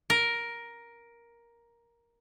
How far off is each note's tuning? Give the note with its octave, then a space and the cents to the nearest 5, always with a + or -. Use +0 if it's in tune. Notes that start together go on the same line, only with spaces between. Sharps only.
A#4 +10